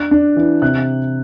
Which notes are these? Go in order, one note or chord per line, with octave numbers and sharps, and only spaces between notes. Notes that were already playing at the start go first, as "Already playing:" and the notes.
Already playing: D4 F#6
D4
E3
C3 F#6